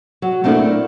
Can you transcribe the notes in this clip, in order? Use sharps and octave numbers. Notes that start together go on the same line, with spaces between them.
F#3
A3 A#3 C4 D4 E4 A4